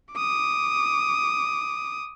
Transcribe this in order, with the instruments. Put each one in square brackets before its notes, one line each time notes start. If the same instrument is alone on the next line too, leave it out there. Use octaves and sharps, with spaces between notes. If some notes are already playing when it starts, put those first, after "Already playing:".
[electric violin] D6 D#6